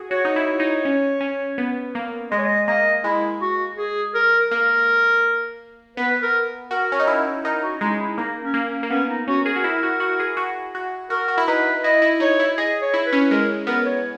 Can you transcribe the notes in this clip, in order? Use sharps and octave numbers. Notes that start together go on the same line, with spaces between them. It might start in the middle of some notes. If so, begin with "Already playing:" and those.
Already playing: F#4 G#4
F#4 C#5
D#4
E4
D#4
C#4
C#4
B3
A#3
G#3 D#5
C#5
D#5
A#3 D#5
G#3 E4
F#4
G#4
A#4
A#3 A#4
B3 B4
A#4
F#4 A#4
C#4
D#4
E4
D#4 A#4
F#4
G#3 D#4
E4
A#3 D#4
C#4
A#3
C#4
A#3
B3 C#4
D#4
C#4 F#4
G#4 A#4
F#4
E4
F#4
F#4
G#4
F#4
F#4
F#4 A#4
F#4
E4
D#4 B4
E4 D#5
E4
D#4 C#5
E4
G#4 D#5
C#5
E4
B4
C#4
G#3 A#4
B3 A#4
C#5